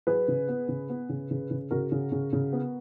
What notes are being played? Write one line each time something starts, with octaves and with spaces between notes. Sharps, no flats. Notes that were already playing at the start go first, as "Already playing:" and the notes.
F#3 G#4 B4
C#3
B3
C#3
B3
C#3
C#3
C#3
C#3 F#4 A#4
C#3
C#3
C#3
B3